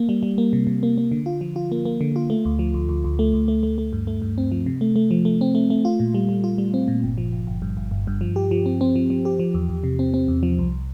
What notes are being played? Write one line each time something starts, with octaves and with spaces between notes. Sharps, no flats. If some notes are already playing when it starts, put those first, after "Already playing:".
Already playing: A#3
G3
G3
A#3
C3
C3
A#3
A#3
D3
F4
F3
F4
A#3
A#3
D3
F4
A3
D2
F3
D2
D2
D2
A3
D2
A3
A3
A3
G2
A3
G2
C4
F3
C3
A3
A3
F3
A3
C4
A3
A3
F4
A#2
G3
G3
F4
G3
C4
A#2
G1
F3
G1
G1
G2
G1
G1
G2
F3
G4
F3
C4
C4
F3
F3
G4
F3
E2
E2
C3
C4
C4
E2
F3
C2